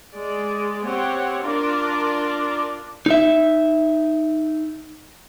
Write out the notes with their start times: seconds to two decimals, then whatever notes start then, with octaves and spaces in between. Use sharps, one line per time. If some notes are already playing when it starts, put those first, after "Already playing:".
0.15 G#3 D5
0.84 C4 G4 C#5 F#5
1.44 D4 F4 A#4 D5
3.06 D#4 E5